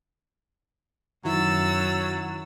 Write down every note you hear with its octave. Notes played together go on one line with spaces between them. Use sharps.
F#2 D#3 F#3 E4 E6 A6